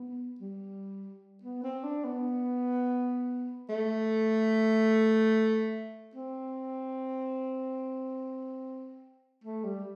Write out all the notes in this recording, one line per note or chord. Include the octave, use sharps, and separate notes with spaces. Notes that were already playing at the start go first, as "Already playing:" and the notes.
Already playing: B3
G3
B3
C4
D4
B3
A3
C4
A3
G3